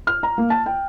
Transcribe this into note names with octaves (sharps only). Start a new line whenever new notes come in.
F6
A#5
A#3
A5
G5